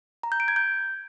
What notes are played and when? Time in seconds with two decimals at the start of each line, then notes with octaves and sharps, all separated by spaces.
0.23 A#5
0.32 G6
0.40 D7
0.48 G#6
0.56 G6